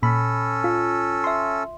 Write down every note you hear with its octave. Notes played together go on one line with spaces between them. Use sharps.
A#2 C#4 A4 B5
F4
E5 C6